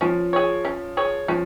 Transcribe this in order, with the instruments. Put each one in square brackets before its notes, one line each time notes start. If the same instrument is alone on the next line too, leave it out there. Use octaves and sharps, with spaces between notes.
[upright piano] F3 [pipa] C#4
[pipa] G#4 C#5
C#4
G#4 C#5
[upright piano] F3 [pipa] C#4